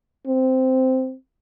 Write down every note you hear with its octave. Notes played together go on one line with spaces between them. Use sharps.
C4